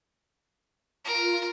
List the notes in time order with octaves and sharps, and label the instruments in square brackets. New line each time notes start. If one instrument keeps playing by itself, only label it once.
[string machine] F4 [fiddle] A#4 A#5